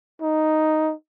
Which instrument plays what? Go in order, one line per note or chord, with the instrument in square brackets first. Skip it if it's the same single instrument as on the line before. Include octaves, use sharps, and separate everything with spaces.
[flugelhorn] D#4